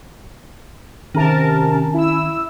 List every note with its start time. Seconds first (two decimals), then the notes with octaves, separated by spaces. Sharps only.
1.15 C3 D#3 C#4 A#4 A5
1.94 E4 E6